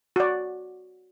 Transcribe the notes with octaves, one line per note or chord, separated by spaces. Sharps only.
F#4 D5